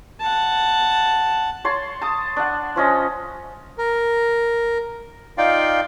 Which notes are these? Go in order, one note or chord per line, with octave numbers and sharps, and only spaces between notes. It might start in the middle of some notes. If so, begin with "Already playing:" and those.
F#5 A5
C#5 A5 C6
A5 D#6
D4 F#5
F3 C#4 D#5
A#4
D#4 F4 D5 F5 G5